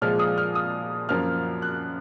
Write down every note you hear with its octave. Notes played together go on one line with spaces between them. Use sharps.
A#2 F3 G#3 F6
D#6
F6
D#6
F#2 F3 A#3 F6
F#6